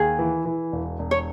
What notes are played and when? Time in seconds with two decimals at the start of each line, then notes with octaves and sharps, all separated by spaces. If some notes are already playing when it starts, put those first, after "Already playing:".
Already playing: D#2 G#4
0.19 E3
0.45 E3
0.72 E1
0.99 E1
1.11 C#5